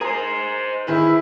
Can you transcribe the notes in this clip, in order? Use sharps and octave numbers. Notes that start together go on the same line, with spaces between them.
G#4 A#4 C5 G#5
D#3 E4 G#4 B4